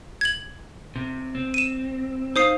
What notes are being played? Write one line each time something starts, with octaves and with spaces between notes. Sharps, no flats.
G#6 F#7
C3
C4
D#7 E7
D#4 C5 F5 D#6 C7